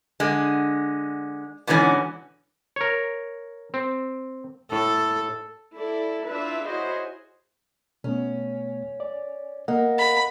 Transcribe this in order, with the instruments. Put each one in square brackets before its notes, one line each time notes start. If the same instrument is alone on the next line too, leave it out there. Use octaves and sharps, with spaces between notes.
[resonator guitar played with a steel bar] D3 G#3
G#2 B2 D3 E3 C#4
[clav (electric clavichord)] A#4 C#5
C4
[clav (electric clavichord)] A2 [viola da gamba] A4
[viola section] E4 A4 D5
D4 E4 F4 B4 D5 E5
E4 F#4 G#4 C5 C#5 D#5
[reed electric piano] B2 A3 B3 [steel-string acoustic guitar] C#4
[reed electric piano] D5
[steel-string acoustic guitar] A#3 [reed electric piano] D#5 F#5
[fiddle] B5